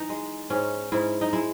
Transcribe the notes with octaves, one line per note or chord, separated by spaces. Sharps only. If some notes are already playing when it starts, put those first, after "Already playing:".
Already playing: E3 D#4
G#3
G#2 C#4
G#2 E4
D#4
G#3 E4